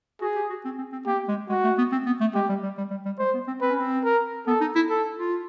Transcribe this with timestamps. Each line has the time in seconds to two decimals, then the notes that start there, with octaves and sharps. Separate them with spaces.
0.21 F#4 G#4
0.36 G4
0.50 F#4
0.65 C4
0.78 C4
0.92 C4
1.06 A#3 G4
1.28 G#3
1.49 G#3 F#4
1.63 A3
1.78 B3
1.92 C4
2.06 B3
2.21 A3
2.35 G#3 G4
2.49 G3
2.63 G3
2.77 G3
2.90 G3
3.05 G3
3.19 G#3 C5
3.34 B3
3.47 C4
3.61 C4 B4
3.71 C#4
3.80 C4
4.05 A#4
4.47 B3 A4
4.61 D#4
4.75 E4
4.90 A4
5.18 F4